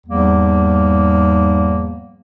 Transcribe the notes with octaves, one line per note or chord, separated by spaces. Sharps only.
E2 G#2 F3 G3 A#3